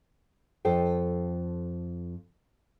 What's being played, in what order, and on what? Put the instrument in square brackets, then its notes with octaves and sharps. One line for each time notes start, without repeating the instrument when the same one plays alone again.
[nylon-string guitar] F2 F4 A4 C5 G5